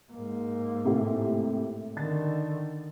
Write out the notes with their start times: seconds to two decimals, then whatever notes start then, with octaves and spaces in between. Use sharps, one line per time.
0.12 G#2 A#3
0.85 A2 C3
1.97 D3 D#3 A6